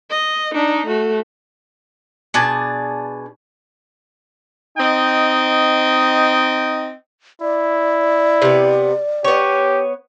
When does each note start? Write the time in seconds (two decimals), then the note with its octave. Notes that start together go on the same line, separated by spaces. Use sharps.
0.10 D#5
0.54 D4 D#4
0.87 A3 F#4
2.34 B2 D4 G#4 A5
4.77 C4 D#4 D#5 G5
7.41 E4 D5
8.42 C3 B3
9.24 B3 G4 C#5